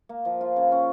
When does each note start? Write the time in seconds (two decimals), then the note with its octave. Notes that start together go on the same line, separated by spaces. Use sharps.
0.09 A#3
0.25 F3
0.41 F4
0.56 C#3
0.72 C#4